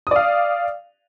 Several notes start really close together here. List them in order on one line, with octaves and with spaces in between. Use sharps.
D#6 D5 F5